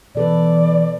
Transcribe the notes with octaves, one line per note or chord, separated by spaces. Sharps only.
B2 E3 A4 B4 D5